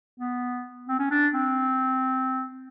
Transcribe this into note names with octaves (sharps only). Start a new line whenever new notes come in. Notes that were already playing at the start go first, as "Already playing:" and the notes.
B3
C4
C#4
D4
C4